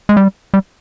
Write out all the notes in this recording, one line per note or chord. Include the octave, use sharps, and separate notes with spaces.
G#3
G3
G3